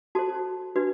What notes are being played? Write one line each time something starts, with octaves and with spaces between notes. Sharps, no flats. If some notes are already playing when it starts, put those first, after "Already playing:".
F#4 A4 C5 A5
D4 F#4 B4